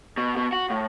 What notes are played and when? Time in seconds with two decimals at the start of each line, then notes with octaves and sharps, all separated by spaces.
0.17 B2
0.37 B2
0.53 F#4
0.70 A2